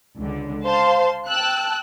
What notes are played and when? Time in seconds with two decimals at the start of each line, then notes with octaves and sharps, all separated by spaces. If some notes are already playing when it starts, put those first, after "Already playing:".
0.18 C#2 D3
0.65 C5 F5 A5 C6
1.27 G5 A5 E6 F#6